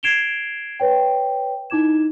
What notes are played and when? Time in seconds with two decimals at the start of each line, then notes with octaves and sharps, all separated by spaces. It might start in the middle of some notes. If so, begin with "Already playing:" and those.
0.03 G#6 C7 D7 E7 F7 G7
0.80 B4 C#5 G5
1.70 D#4 E4 D6 G#6 E7